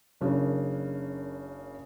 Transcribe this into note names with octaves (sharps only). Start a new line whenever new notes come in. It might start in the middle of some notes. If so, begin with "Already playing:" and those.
F#1 C#3 F#3 D4 A#4